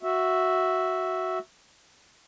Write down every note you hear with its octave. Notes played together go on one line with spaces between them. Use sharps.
F#4 E5